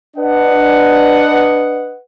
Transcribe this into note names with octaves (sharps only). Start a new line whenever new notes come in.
D4 B4 D#5 F#5